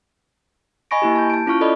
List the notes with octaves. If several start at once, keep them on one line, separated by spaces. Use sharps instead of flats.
D#5 G#5 B5 C#6 A#6 D7
A#3 E4 G4
A5 G6
A5 D7
C#4 E4 F4 C#6 F6
A4 D5 D#5 B5